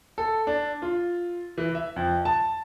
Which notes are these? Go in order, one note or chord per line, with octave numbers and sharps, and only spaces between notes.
A4
D4
F4
E3
E5
F2
A5